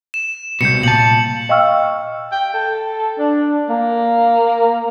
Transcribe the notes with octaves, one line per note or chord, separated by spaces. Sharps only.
E7
C2 B2 G6 C#7
A#2 A5 F#7
D#5 F5 G5 C#6 E6 F6
G5
A4
D4
A#3